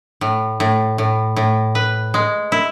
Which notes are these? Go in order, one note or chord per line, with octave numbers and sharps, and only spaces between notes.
A2
A2
A2
A2
B4
G#3
E4